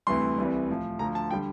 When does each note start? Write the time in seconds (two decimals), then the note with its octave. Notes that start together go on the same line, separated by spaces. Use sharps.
0.07 D2 C3 E3 G3 C6
0.38 C2 C3 E3 G3
0.69 A2 F3
0.99 D2 D3 F3 A#5
1.15 A5
1.31 D3 G3 G5